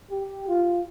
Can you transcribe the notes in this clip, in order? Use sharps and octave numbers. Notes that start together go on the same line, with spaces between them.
G4
F4